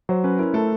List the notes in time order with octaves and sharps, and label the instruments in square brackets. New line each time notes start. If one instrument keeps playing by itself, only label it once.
[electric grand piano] F#3 [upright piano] C5
[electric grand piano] C#4 [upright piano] B4
[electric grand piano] E4 [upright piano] A#4
[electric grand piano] A3 [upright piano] A4